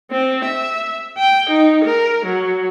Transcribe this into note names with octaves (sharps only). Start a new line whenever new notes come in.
C4
E5
G5
D#4
A#4
F#3